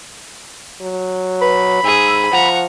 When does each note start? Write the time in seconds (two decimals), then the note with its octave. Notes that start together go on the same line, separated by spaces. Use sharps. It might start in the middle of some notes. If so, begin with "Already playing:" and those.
0.82 F#3
1.41 B4 B5
1.84 G#2 G#4 E6
2.33 F3 F#5 A#5 C#6